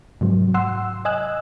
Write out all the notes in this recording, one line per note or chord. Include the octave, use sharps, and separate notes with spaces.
G#2 C3 F#3
F#5 C6 E6
D#5 G#5 E6 F#6